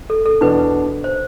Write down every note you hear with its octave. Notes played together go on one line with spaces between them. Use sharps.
A4
A4
E2 B2 B3 D4 B4
C5